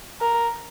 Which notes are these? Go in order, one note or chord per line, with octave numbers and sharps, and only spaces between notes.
A#4